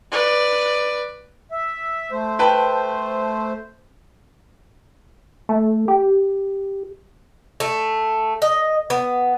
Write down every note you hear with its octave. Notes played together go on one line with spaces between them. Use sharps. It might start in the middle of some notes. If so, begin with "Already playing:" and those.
B4 D5
E5
A3 C5
B4 G5 A5
A3
G4
A3
D#5
B3